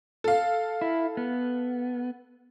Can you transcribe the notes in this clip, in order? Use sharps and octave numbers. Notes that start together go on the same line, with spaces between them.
A4 F5
E4
B3